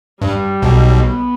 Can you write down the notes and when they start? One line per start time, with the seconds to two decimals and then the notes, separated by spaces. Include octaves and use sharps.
0.22 G2 G3
0.62 B1 B2
1.04 B3